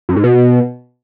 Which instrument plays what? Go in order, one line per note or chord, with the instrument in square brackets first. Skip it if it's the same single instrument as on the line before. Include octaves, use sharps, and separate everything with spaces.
[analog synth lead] F#2
G#2
B2